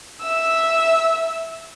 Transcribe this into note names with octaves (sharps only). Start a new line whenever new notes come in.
E5 E6